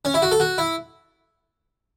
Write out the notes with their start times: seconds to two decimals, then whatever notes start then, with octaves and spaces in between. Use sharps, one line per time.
0.05 C#4
0.14 E4
0.22 F#4
0.32 A4
0.40 F#4
0.58 E4